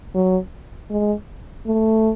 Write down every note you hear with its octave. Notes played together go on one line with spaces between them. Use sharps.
F#3
G#3
A3